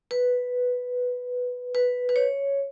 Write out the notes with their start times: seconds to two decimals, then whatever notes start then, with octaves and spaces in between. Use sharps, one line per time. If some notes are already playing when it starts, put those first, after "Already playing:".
0.11 B4
1.75 B4
2.09 B4
2.16 C#5